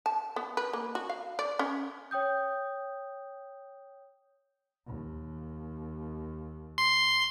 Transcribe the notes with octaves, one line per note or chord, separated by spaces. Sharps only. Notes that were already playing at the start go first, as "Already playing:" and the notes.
A5
B3
B4
A#3
F#4
F5
D5
C#4
C#5 G5 D#6 G6
D#2
C6